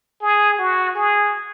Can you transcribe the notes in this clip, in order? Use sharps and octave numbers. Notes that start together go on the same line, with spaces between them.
G#4
F#4
G#4